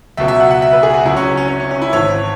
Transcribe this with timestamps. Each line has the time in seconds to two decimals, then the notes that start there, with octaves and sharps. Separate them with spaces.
0.17 C#2 B2 F#3 E5
0.28 E5
0.40 F#5
0.51 F#5
0.62 E5
0.73 B4
0.83 G#4
0.94 F#4
1.05 C#2 C#3 F#3 E4
1.17 C#4
1.37 C#4
1.48 C#4
1.60 C#4
1.71 C#4
1.82 E4
1.93 G#1 G#2 E3 C#5